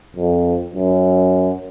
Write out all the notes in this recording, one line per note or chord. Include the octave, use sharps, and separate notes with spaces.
F2
F#2